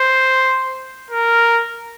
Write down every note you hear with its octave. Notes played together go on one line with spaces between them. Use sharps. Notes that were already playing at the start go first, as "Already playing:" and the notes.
Already playing: C5
A#4